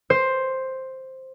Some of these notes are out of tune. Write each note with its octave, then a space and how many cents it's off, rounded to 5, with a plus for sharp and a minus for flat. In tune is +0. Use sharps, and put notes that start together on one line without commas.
C5 +5